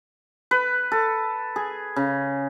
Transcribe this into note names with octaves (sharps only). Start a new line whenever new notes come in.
B4
A4
G#4
C#3